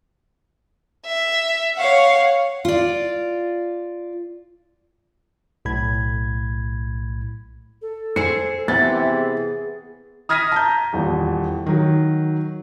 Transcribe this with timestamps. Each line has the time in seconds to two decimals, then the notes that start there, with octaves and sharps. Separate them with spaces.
1.05 E5
1.75 C#5 F5 F#5
2.65 F4 D5
5.65 B1 A2 B5 G#6
7.82 A4
8.16 G#4 C5 C#7
8.68 C3 E3 B3 E5 A6
9.10 G#4
10.29 D#6 F6 G#6 A#6 B6 D#7
10.52 A5 A#5 G6
10.93 D#1 E2
11.66 D#3 F#3